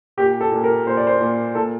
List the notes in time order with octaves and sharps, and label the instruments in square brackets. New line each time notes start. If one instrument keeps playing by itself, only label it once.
[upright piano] A#2 G4
A4
A#2
A#4
A#2 C5
D5
C5
A#2
A#2 A4